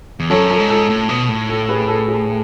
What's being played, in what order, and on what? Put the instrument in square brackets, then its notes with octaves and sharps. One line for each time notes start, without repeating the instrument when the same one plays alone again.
[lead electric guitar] E2
[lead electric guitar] F#2 [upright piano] A4 C#5
[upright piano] A4
[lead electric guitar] G#2
[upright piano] A4
[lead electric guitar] A2
B2
A2
[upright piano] A4
G#4 B4
A4
G#4